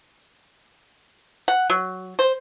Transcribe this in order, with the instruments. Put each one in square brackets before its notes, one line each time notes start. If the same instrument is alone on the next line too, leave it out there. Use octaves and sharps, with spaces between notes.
[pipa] F#5
F#3
C5